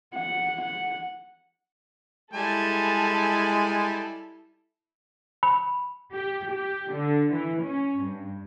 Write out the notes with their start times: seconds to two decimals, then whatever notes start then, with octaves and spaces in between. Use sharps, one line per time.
0.14 F#5
0.61 F#5
2.33 G3 G#3 E4 A4 G#5 A5
5.43 B5
6.14 G4
6.51 G4
6.93 D3
7.33 E3
7.64 C#4
8.03 G2